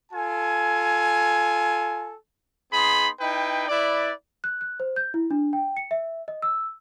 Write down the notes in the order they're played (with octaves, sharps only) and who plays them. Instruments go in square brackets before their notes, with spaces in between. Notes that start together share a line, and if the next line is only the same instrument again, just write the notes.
[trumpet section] F4 A4 G#5
B3 D#4 G#4 B5 C6
D#4 E4 B4 G5
E4 B4 D5
[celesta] F#6
F#6
C5
G6
E4
D4
G5
C#7
E5
D#5
E6